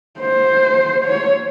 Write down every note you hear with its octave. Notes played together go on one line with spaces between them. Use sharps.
C5
C#5